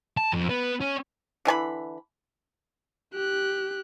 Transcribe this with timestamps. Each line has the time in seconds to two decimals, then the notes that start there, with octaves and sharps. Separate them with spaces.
0.17 A5
0.32 F2
0.49 B3
0.81 C#4
1.45 D3 E3 G#5 B5
3.14 G4 F#6